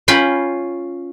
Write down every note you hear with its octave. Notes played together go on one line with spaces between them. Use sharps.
C#4 F4 G5 B5